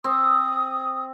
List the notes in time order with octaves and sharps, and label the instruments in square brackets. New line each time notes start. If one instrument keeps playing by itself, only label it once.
[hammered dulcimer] C4 [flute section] D#6